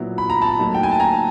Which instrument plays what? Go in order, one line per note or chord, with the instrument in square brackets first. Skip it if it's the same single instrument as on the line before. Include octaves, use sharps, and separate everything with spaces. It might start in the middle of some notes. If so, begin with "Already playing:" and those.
Already playing: [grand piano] A#2 F#3 B3 E4
B5
A#5
A5 B5
A2 F#3 A#3 D#4
G5
G#5
A5
G#5 A#5